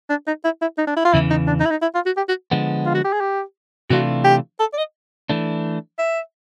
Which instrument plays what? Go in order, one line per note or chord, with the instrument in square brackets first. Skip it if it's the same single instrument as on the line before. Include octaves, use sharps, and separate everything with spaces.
[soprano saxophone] D4
D#4
E4
E4
D#4
D4
E4
F4
[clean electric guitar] E2 C#3 E3 [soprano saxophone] E4
[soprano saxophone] D#4
D4
D#4
E4
D#4
E4
F4
F#4
G4
F#4
[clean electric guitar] D3 F3 G#3 B3
[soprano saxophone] F4
F#4
G4
G#4
G4
[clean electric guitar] C3 E3 A3 D4 F4 [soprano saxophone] F#4
[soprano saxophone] G4
A4
D5
D#5
[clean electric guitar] E3 A3 D4
[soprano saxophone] E5